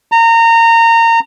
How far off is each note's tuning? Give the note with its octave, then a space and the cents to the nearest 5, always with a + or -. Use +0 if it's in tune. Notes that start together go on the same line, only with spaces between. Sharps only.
A#5 -25